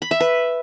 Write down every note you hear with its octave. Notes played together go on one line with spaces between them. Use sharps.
B5
E5
B4